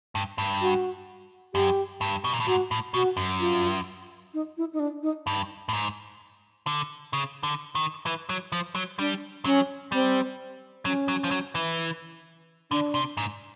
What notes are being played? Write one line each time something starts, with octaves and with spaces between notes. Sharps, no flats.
G2
G2
F#4
F#2 G4
G2
B2
A#2
A2
G#2 F#4
A2
B2 F#4
F#2
F4
D#4
E4
D#4
D4
D#4
G2
A2
G#2
D3
C#3
D3
D#3
E3
F#3
F3
F#3
G3 D4
F#3 C#4
G3 C4
F#3 C#4
F#3
F3
F#3
E3
D3 D4
C3
G#2